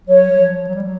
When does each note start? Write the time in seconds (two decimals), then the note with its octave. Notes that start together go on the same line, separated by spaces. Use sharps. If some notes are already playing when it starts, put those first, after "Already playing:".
0.08 F#3 C#5
0.31 F#3
0.38 F3
0.68 F#3
0.75 G3
0.82 F#3